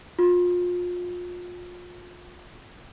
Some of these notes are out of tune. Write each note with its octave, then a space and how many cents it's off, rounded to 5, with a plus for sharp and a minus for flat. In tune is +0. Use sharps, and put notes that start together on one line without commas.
F4 +30